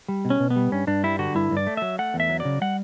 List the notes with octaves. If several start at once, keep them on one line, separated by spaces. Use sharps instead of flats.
G3
B2
C#4
B2
B3
G3
G2 C#4
G2 D4
G3 E4
D3 F#4
G2 E4
G2
D5
A3
F#3 E5
A3 F#5
E2
E5
F#3
D5
C#3
G3 F#5